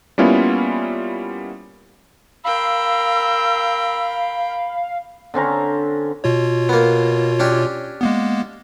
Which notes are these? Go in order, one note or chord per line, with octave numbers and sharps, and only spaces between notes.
G3 A#3 B3 C#4 E4 F4
A#4 F5 G5 B5 E6
D3 C4 C#4 A#5
B2 F4 C#5
A#3 B3
C#4 D4 G4
G#3 A#3 B3